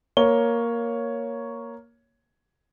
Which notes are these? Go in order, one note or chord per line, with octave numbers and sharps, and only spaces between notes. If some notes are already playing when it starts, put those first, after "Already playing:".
A#3 C#5 G7